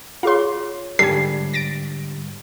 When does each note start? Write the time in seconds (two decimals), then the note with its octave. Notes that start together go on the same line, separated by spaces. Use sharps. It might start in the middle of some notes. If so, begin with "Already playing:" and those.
0.23 F4 G#4 C#5 F5 C6
0.99 G#2 D3 G3 A4 G#5 C7
1.53 A6 A#6 D7